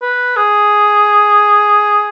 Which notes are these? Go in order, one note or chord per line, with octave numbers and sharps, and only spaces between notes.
B4
G#4